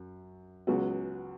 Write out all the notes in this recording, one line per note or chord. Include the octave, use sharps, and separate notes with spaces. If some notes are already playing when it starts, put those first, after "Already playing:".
Already playing: F#2
C#2 C#3 F#3 B3 F#4